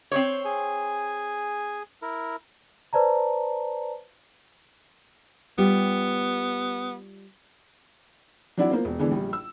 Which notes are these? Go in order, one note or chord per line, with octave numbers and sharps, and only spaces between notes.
C4 C5 C#5
G#4 G#5
E4 A#4
B4 C5 D5 A5 A#5
G3 B3 F4 G4
F#3 C4 D4 E4 D5 F#5
A#3 B3 F4 C5
E1
D3 E3 G#3 B3 D4
A#1 G3
E6